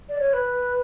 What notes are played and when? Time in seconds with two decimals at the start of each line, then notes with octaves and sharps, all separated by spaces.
0.09 D5
0.19 C#5
0.33 B4